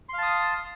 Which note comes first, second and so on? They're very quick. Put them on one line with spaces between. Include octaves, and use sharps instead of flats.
C6 F5 A5 D#6